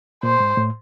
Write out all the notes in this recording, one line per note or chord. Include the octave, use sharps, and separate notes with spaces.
A#2 C5
G#2
A2